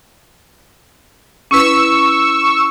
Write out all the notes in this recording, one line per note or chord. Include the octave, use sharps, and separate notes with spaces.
C#4 E4 B4 C#6 E6